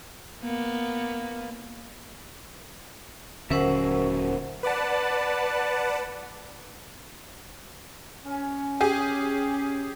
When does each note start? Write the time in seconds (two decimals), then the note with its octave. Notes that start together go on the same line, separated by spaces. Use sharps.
0.42 A#3 B3
3.50 D#1 D3 F#3 C#4 A#4 C5 E5 F#5
4.63 B4 D5 F#5 A5
8.24 C#4
8.81 G4 G#4 G#5